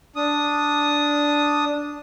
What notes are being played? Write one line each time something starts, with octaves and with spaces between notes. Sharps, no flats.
D4 D#6